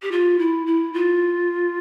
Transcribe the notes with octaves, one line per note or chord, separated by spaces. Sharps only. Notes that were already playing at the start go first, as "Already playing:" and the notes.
G4
F4
E4
E4
F4